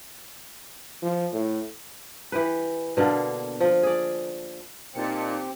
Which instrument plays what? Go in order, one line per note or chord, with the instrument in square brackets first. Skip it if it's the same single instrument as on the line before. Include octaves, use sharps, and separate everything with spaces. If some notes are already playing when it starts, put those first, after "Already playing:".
[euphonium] F3
A2
[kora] E3 G4 B4
B2 D3 A#3 F5
F3 F4
G#4 D5
[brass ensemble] A#2 [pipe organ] C4 G4 [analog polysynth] D#4 A5 C#7